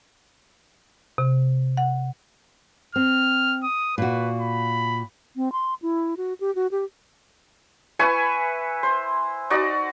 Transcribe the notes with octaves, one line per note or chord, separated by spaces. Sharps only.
C3
F#5
C4 F6
D#6
A#2 F#4 B4
B5
C4
C6
E4
F#4
G4
F#4
G4
E4 B4 G#5 C#6
C5
D#4 F#4 D5